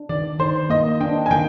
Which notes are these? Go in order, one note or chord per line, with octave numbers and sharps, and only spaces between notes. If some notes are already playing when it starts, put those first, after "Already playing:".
Already playing: D4
D#3 D5
D#3 C5
A#3 D#5
D4 G5
G#5
D#3 G5